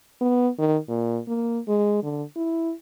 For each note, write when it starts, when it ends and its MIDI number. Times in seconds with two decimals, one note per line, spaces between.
0.21 0.48 59
0.58 0.77 51
0.88 1.19 46
1.27 1.59 58
1.68 1.98 56
2.03 2.23 50
2.36 2.73 64